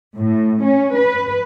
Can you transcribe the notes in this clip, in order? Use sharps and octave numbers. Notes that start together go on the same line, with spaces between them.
A2
C#4
B4